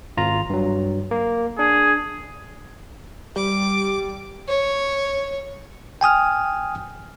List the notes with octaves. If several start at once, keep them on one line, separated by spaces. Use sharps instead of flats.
G#1 F4 A#5
G2 F#3
A#3
D4 G#4
G3 D6
C#5
G5 G#5 D#6 F6